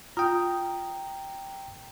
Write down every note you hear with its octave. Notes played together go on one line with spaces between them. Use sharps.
F4 G5 A#5 D#6